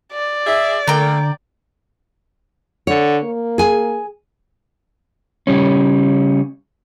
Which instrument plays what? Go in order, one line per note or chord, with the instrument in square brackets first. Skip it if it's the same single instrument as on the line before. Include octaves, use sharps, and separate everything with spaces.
[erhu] D5
[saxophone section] G#4 E5
[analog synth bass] D3 [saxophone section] A3 A#3 [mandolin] G5 A#5
[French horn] D3 [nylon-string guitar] C#5
[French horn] A#3
[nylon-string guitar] G#4 G#5
[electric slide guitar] C#3 G3 C#4